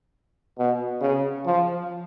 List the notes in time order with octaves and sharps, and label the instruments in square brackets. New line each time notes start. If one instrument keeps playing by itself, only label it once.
[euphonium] B2
C#3
F3